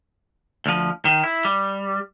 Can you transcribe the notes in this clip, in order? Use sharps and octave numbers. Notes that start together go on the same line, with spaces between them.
D2 F3
D#3
E4
G3